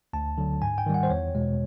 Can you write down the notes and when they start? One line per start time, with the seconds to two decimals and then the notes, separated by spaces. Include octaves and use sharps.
0.13 D2 A5
0.38 D3 F#3
0.62 G#2 G#5
0.78 G5
0.86 D#3 G3
0.94 F#5
1.03 C5
1.10 E2 C#5
1.35 B2 G#3